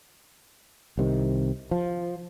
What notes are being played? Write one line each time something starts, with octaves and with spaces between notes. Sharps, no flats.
C2 C3 D#3
F3